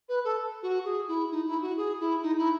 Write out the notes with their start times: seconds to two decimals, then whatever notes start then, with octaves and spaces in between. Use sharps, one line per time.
0.08 B4
0.24 A4
0.62 F#4
0.84 G#4
1.07 E4
1.31 D#4
1.46 E4
1.61 F#4
1.76 G#4
1.99 E4
2.22 D#4
2.37 E4